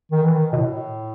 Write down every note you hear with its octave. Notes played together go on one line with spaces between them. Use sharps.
D#3
E3
D#3
B2
A2